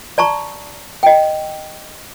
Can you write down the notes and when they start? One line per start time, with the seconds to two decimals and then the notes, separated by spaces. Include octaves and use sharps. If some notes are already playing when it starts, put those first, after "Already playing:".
0.18 D5 A5 A#5 C#6
1.03 D#5 G5